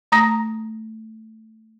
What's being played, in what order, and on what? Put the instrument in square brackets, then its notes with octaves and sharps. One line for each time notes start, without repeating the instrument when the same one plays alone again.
[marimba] A3 A#5 D#6 A#6